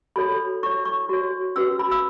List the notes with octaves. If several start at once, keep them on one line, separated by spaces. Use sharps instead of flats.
F#4 A4 C#5 B5
E4 C#5 C#6
C#6
F#4 C#5
C#4 F#4 B4 E6
B5
E6